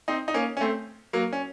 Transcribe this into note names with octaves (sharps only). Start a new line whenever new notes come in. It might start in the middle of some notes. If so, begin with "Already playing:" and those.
C4 D#4
D#4
A#3 C#4
C#4
A3 C4
F#3 A#3
C#4